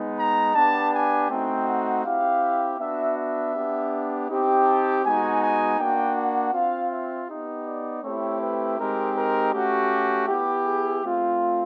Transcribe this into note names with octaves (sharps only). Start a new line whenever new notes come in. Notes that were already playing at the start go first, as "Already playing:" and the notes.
Already playing: G#3 B3 D#4
A#5
B3 D4 G4 A5
G#5
A3 C4 D#4 F#4 G5
F#5
C4 E4 G4 F5
B3 D4 F#4 E5
E5
B3 D4 G4
C4 D#4 G4
A5
G#3 B3 D#4 F#4 G#5
G#5
A#3 D4 F#4 G5
F#5
C4 F4 F5
E5
B3 D#4 G4
D5
A3 C4 E4 G4 C#5
B4
G#3 C4 D#4 G4 A#4
A#4
A3 C#4 F#4 G4
B3 E4 G4
G#4
A3 C4 F4